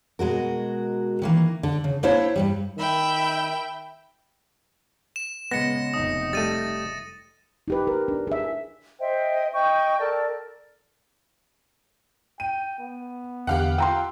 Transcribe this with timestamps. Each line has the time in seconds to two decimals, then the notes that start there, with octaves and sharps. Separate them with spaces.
0.19 B2 G#3 F#4 A#4
1.22 D#3 E3 A#3
1.63 D3
1.84 C#3
2.03 A#3 D4 E4 C5 C#5 E5
2.36 G2 D#3 G3
2.78 D#3 E5 G5 B5
5.16 E7
5.51 C#3 G#3 B3 A#6 C#7
5.94 F1 D#4 D#6
6.33 G3 A3 A6 D#7
7.68 D#4 G4 B4
7.87 A#4
8.08 D4
8.27 G#4 E5
9.00 C5 D#5 E5 G5
9.54 D#5 G5 C#6 G6
9.99 A4 A#4 D5 A5
12.40 G5 D#7
12.79 B3
13.47 E2 D3 G4 F5 F#5
13.78 F4 G5 A#5 C6 E6